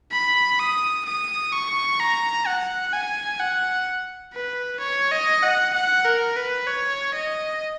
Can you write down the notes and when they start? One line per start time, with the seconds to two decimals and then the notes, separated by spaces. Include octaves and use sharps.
0.13 B5
0.59 D#6
1.06 D#6
1.53 C#6
2.00 A#5
2.47 F#5
2.93 G#5
3.40 F#5
4.34 B4
4.80 C#5
5.12 D#5
5.43 F#5
5.74 F#5
6.05 A#4
6.37 B4
6.67 C#5
7.14 D#5